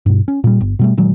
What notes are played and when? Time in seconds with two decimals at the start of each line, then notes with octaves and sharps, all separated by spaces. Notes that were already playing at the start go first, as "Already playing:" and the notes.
0.06 G2 B2
0.28 C#4
0.44 A#2 G3
0.61 G1
0.79 B2 G3 A3
0.97 A#2 D#3 F#3 G#3